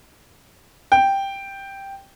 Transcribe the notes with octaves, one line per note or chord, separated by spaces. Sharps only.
G5